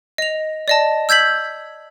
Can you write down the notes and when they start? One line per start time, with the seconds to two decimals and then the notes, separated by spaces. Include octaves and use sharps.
0.18 D#5 F7
0.68 D5 D#5 A5
1.09 E6 G6 G#6 B6 F#7